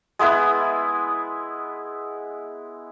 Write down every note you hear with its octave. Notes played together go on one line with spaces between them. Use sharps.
G#3 B3 E4 B4